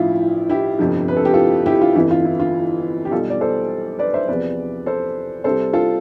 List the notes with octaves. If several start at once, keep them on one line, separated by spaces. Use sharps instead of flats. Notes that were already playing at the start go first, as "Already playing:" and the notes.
Already playing: A1 G2 F3 E4 F4
E4 G4
G1 F2 C3 F3
B4
A4
G4
F4 A4
E4 G4
F4
G1 F2 E3 E4
F4
E4
F4
G4
B1 B2 G3 F4 A4
D5
A4 C5
B4 D5
C5 E5
E2 C3 F3 B4 D5
A4 C5
C2 C3 G3 A4 C5
F4 A4